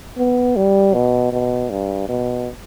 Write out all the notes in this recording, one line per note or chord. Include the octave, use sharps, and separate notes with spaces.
B3
G3
B2
B2
G2
B2